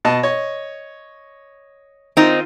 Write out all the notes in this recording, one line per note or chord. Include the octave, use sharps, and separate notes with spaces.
B2 D#5 A5
C#5 D#5
D#3 C4 D#4 F4